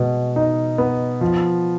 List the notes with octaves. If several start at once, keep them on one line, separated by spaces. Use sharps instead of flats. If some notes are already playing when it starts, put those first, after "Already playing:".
Already playing: B2 G#3
D#4
B3
F3